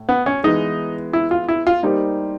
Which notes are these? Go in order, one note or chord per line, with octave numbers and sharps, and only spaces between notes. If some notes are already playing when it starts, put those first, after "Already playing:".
Already playing: A2
B3
C#4
E3 G#3 B3 D#4
E4
F4
E4
F4
G3 A#3 D#4 G4 C5